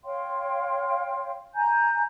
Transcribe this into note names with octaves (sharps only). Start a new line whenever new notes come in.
C#5 F5 G5 C6
G#5 A#5 G6